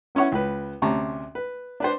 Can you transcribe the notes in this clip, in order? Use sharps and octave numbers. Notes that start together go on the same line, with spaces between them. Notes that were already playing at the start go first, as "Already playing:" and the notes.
B3 C#4 E4 C#5 F#5
C#2 B4
D2 C3 C#4 A5 A#5 C#6
B4
D4 B4 C5